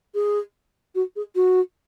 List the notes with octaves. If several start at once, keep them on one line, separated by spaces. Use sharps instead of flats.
G#4
F#4
G#4
F#4